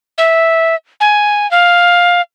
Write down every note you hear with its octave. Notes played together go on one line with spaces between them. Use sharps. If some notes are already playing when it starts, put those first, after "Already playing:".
E5
G#5
F5